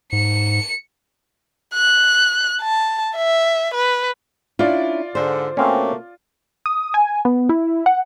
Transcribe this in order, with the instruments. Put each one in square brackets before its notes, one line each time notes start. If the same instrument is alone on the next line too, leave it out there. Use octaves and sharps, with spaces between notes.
[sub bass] G#2 [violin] C#7
[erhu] F#6
A5
E5
B4
[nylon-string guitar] C#4 D4 E4 [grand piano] F4 D5
[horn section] G#2 D3 [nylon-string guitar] C5
[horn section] B2 A3 A#3 [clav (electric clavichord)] C4 C#4
[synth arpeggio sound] D#6
G#5
B3
E4
F#5